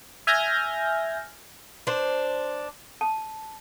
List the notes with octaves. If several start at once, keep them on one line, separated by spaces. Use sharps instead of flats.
E5 G#5 F6 G6 G#6 A#6
D4 C5
A5